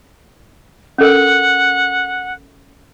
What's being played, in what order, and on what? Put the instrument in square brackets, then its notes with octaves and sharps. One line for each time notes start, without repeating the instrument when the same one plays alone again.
[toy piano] C#4 A4 A#4 [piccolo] F#5